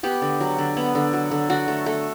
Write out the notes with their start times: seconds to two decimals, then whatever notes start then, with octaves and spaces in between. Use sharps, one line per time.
0.03 B3 G4
0.22 D3
0.40 F#3
0.58 D3
0.77 B3
0.95 D3
1.13 F#3
1.31 D3
1.50 D3 F#4
1.68 A3
1.86 A3